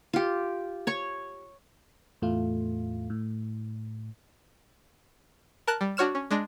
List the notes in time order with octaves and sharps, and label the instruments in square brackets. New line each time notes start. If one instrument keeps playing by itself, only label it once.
[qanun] F4 G4
C#5 C#6
[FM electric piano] E2 A2 A3 F4
A2
[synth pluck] A#4 A5 F#6
G3
D4 F#4 C#5 F6 E7
C#4
G#3 D4 A#6